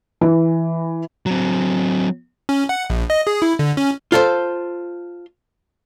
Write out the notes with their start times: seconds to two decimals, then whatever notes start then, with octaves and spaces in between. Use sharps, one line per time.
0.21 E3
1.26 F#3 C4
2.49 C#4
2.69 F#5
2.90 A#1
3.10 D#5
3.27 G#4
3.42 E4
3.59 D3
3.77 C#4
4.12 F4 A4 C5